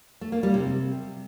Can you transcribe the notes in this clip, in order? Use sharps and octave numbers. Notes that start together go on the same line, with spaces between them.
A3
A#3
G3
C3